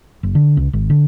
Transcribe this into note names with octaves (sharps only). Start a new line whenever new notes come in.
F#1
D3
C#2
G#1
D3